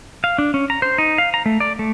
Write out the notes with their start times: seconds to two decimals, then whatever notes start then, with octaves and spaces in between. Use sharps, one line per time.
0.24 F5
0.38 D4
0.54 C#4
0.70 A#5
0.82 C5
0.98 D#4
1.18 F5
1.34 A#5
1.46 A3
1.60 D5
1.79 A3